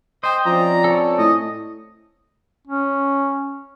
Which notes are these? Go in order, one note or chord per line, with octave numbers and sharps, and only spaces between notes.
C5 D#5 G5
F3 C4 C#4 D5 A#5
A4 C#5
A2 D#5
C#4